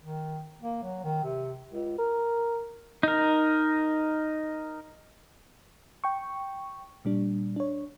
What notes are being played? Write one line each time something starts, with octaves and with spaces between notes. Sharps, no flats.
D#3
A#3
F#3
D#3
C3
C#2
A#4
D#4 A#4
G5 C#6
A#2 G3 D4
D4 C#5